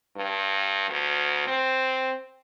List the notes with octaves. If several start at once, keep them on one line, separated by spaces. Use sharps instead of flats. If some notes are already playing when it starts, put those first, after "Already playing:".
G2
D2
C4